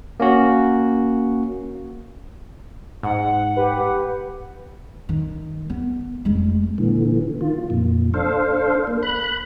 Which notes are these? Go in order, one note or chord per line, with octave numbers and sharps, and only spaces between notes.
A#3 C#4 F#4
G#2 F#5
G4 B4
D#3
B3
F1 G#3
A#2 D3 E3
D#3 F4
F2 A#2
D4 A4 C5 F5
A#3
B5 F#6